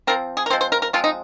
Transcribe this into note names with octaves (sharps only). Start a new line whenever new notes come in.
F3 C4 A#4
G#4
A#4
F3 G#3 C4 C5
C5
A#4
A#4
F3 G#3 C4 F4
D#4